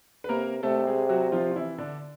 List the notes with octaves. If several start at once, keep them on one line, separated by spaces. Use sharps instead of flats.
B4
C3 A#3 A#4
C3 A3 A4
G#3 G#4
F#3 F#4
F3 F4
F4
E3 E4
D3 D4